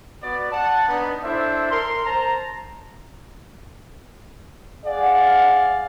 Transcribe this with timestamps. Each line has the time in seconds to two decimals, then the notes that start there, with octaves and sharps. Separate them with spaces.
0.23 B3 F#4 D5
0.52 F#5 A5
0.88 B3 D4 D#4
1.24 D4 E4 A4 C5 E5
1.71 A#4 C6
2.05 C5 A5 A#5
4.86 G#4 D5 F5 F#5